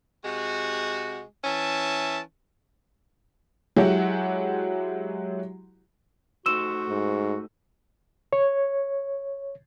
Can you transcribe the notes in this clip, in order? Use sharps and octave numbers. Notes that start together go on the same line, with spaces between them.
C3 G#3 F#4
E3 C#4 E5 A5
F#3 G#3 E4 F#4 G4 F#5
A3 D#4 F#4 C5 E6 E7
G#2
C#5